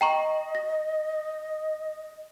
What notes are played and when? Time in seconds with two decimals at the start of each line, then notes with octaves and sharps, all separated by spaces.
0.01 D#5 G5 A#5 C#6
0.55 A#6